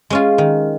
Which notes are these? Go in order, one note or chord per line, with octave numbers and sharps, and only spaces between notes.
G#3 C#4 F4
D#3